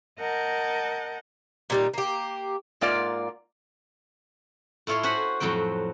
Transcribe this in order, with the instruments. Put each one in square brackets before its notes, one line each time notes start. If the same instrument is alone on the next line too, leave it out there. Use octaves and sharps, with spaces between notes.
[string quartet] A#4 D#5 F#5 A5 G6
[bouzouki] A#2 G3 D#4
A#3 G4
[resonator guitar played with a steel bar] G#2 A#3 F4 D5
[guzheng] A2 E4 F4 C#5 F5 C6
F#4 C5 F#5 G#5 B5
F2 A2 F#3 C4 G5